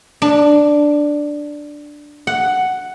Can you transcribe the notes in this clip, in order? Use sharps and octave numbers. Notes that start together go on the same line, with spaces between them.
D4
F#5